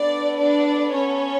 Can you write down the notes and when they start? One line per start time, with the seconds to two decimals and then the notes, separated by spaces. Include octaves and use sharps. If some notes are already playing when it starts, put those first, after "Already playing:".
Already playing: B3 D4 A4 D5
0.37 D4 D5
0.92 C#4 C#5